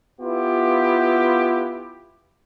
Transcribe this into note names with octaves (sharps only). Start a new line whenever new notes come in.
B3 E4 F4 G4